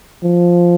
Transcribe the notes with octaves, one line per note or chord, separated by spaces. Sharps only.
F3